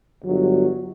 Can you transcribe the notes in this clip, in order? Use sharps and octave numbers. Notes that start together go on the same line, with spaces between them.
G1 F#3